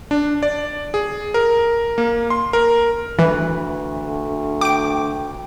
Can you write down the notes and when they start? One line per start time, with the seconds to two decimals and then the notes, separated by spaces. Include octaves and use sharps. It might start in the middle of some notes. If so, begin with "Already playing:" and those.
0.11 D4
0.43 D5
0.94 G#4
1.34 A#4
1.98 A#3
2.30 C6
2.53 A#4
3.19 D2 E3 B4
4.61 G5 D6 D7